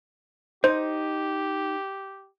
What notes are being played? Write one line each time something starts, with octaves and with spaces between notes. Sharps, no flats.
D#4 G4 C5